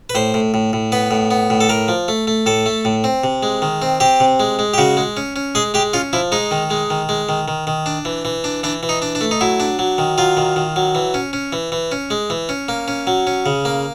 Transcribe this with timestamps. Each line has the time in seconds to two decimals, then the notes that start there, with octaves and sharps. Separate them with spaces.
0.10 B4
0.15 A2 C5
0.34 A2
0.54 A2
0.73 A2
0.92 B3 B4
1.11 A2
1.31 B3
1.50 A2
1.61 A4
1.69 A2 A#4
1.88 F3
2.08 A3
2.27 A3
2.46 A2 A4
2.66 A3
2.85 A2
3.04 C4
3.24 C3
3.43 G#3
3.62 D#3
3.82 C4
4.00 C4 G4
4.20 C3
4.40 G#3
4.59 G#3
4.74 G4
4.78 C#3 F#4
4.97 G#3
5.17 C#4
5.36 C#4
5.55 G#3 G#4
5.74 G#3 G4
5.94 C#4 F4
6.13 F3 E4
6.32 G#3 D#4
6.51 D#3
6.70 G#3
6.90 D#3
7.09 G#3
7.29 D#3
7.48 D#3
7.67 D#3
7.86 D4
8.05 E3
8.25 E3
8.44 D4
8.63 E3 D4
8.83 E3
8.89 D#4
9.02 D4
9.15 D4
9.21 A3
9.31 D#4
9.41 F#3 E4
9.60 D4
9.79 F#3
9.98 D#3
10.18 F#3 F4
10.37 D#3
10.56 D#3
10.76 F#3
10.95 E3
11.14 C#4
11.33 C#4
11.53 E3
11.72 E3
11.92 C#4
12.11 G#3
12.30 E3
12.49 C#4
12.69 A#3
12.88 C#4
13.07 F#3
13.27 C#4
13.46 C#3
13.65 A#3